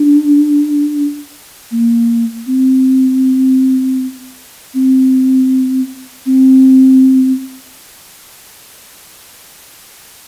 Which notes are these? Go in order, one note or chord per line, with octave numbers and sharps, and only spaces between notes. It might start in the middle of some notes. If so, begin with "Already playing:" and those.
Already playing: D4
A#3
C4
C4
C4